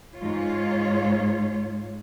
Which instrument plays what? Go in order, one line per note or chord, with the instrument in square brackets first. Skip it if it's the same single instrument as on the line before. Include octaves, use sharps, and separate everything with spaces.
[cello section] G#2 F4 C#5